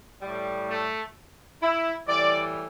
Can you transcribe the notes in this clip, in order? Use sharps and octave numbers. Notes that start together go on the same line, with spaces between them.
A2 G3
A3
E4
A2 E3 G3 D5